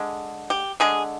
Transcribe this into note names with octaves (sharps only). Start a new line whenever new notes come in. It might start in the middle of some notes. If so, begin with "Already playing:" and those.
Already playing: D3 G#3
G4
D3 G#3 G#4